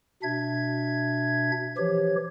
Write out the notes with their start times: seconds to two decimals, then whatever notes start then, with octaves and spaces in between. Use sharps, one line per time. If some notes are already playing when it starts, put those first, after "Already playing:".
0.23 B2 D4 E5 G#6
1.77 E3 F3 G4 C#5